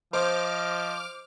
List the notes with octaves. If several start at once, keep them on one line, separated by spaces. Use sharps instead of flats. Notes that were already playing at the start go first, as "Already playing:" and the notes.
F3 C5 D#5 D6 F6